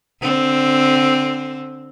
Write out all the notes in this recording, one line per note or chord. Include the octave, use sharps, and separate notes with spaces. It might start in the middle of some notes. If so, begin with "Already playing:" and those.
D3 C4